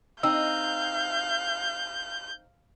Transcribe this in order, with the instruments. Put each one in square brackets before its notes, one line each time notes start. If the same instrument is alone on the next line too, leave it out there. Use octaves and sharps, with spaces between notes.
[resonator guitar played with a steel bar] C4 D#4 [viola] F5 [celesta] E6 [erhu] G6